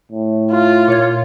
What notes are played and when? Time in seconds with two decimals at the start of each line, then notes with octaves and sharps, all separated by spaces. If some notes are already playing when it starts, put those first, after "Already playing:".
0.12 A2
0.51 F4
0.88 A#2 C#5 G#6